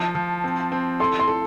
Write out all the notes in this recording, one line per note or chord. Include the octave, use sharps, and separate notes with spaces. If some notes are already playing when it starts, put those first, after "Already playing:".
Already playing: F3 A5
F3
C4
C4
A4 C6
C6
A4